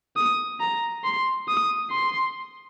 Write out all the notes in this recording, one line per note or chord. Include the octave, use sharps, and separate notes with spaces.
D#6
A#5
C6
D#6
C6